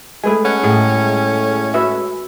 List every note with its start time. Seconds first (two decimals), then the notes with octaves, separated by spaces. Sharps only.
0.24 G#3 A3 G#4 B4 G#5
0.45 C#4 F#5
0.63 A2 G3 G#4
1.74 F#4 B4 E5